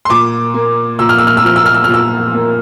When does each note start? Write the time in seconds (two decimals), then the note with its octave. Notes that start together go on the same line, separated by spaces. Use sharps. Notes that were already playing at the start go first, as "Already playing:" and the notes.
0.05 C6
0.09 A#2 D6
0.54 A#3
0.99 A#2 E6
1.09 F6
1.18 E6
1.27 F6
1.37 E6
1.44 F3 F6
1.56 E6
1.66 F6
1.74 E6
1.84 F6
1.89 A#2
1.94 E6
2.34 A#3